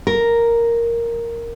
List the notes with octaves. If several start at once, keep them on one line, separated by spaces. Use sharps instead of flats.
A#4